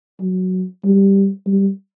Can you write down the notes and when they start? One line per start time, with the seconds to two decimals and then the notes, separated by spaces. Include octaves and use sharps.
0.21 F#3
0.85 G3
1.47 G3